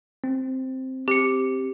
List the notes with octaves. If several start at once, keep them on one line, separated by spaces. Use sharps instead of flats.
C4
C4 G4 C#7